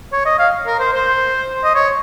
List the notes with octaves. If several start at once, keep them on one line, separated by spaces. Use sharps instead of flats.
C#5
D#5
F5
A#4
C5
C5
D#5
C#5